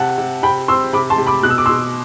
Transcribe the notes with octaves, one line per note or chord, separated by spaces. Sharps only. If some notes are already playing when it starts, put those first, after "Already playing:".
Already playing: C3 F#5 A5
C3
C3 G5 B5
C4 C6 E6
C3 B5 D6
A5 C6
C3
B5 D6
B2 F#6
E6
D6
B2 C6 E6